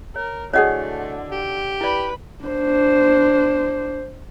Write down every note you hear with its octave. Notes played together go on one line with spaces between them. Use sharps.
A#4 C#5
D3 A3 E4 F#4 G#4 C#5 D#5 F#5
G4
E4 B4 D5
D4 C5